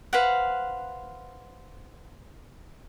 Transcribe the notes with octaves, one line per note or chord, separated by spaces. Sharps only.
B4 C5 F5 F#5